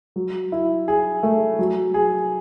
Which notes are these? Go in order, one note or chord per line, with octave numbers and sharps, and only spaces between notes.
F#3
E4
G#4
A3
F#3
G#4